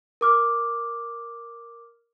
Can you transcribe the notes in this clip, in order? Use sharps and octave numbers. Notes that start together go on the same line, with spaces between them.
A#4 D6 F6